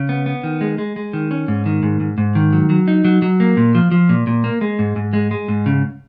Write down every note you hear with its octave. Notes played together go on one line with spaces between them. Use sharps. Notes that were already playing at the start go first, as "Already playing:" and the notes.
Already playing: C#3
B3
B3
D#3
G#3
G#3
G#3
D#3
C#4
G#2
D#3
G#2
G#2
G#2
D#3
F#3
F#3
D#4
F#3
F#3
A#3
A#2
F3
F3
A#2
A#2
A#3
G#3
G#2
G#2
G#3
G#3
G#2
C#3